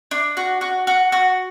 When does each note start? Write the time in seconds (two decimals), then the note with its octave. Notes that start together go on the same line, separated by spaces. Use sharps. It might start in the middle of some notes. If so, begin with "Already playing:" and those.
0.11 D4
0.37 F#4
0.61 F#4
0.87 F#4
1.12 F#4